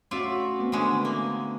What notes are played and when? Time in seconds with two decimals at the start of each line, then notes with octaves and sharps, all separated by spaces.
0.11 A3 C#4 F4 F#4 D5 E5
0.59 A3 B3 C4
0.72 D3 E3 G#3
1.05 A#3